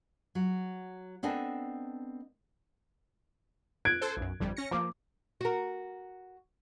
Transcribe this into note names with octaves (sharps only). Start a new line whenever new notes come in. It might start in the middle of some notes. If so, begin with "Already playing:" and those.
F#3
B3 C4 D4 A4 D#5 G#5
F#6 G#6 D7
A4 C5
B1 F#2
G1 F2 G3
C#4 A#6 C#7
F3 A#3 D6
F#4 A#4